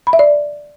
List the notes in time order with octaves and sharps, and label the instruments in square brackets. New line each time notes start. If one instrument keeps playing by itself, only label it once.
[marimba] B5
E5
D5